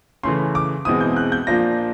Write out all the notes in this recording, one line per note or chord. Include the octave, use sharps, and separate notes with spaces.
C#3 E3 A3 C#4 C6
D6
E2 B2 G#3 C4 E4 D#6
G6
F#6
G6
A#2 F3 A#3 D4 F4 A#6